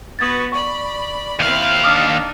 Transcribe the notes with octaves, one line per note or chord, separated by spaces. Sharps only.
B3 F#4 B4 D#6 G#6 A6
D5 B5 C#6
D#2 C4 E4 F5 F#6
D4 D#4 D6 D#6 F6